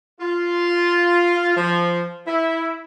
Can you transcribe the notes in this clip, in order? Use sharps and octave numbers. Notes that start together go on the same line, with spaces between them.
F4
F3
E4